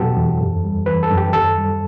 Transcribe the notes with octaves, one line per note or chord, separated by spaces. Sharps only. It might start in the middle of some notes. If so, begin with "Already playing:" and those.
Already playing: E2 B2 F#3 F#4 G4 A4
E2
F#2
G3
E3 B4
A4
F#2
G4
D#2 A4
G3